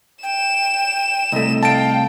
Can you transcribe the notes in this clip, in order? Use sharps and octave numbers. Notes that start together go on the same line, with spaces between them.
G5 E7
C2 A3 D#5
F5 G5 A5 D7